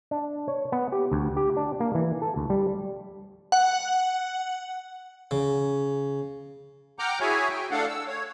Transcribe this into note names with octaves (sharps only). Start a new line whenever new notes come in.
D4
C#5
B3
G4
D2
G4
D4
A#3
E3
A4
D2
G3
F#5
C#3
F#5 G5 A#5 D6 F6 G6
E4 F#4 G#4 C#5 E5 G#5
G5
A3 D4 A4 F5 F#5
E6
C#5